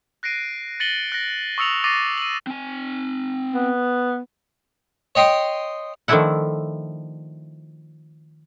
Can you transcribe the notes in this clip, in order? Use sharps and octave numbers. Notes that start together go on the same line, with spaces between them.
F#6 A#6 C7 D7 D#7
A6 A#6 C#7 D#7 F#7 G7
F#6 A#6
C#6 D#6 E6 C#7 F7 F#7
C#6 D6 A6 A#6 C7 D#7
D#7 F#7
C4 G#5
B3
C#5 D#5 G5 C6 D#6
D#3 F3 A3 D4 E4 F#5